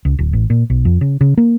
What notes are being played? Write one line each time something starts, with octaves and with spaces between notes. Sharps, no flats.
C#2
D1
A1
A#2
B1
F2
C#3
C#3
A#3